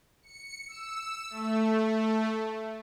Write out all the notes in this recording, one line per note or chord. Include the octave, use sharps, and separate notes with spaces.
C#7
E6
A3